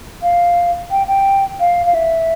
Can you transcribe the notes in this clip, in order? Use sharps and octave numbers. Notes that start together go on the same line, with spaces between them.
F5
G5
G5
F5
F5
E5